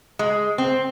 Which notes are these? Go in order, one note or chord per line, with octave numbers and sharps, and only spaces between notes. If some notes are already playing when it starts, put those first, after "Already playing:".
G#3
C4